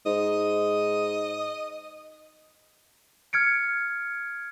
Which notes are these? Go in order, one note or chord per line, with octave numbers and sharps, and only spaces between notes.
G#2 D#5
F6 G#6 C#7 D7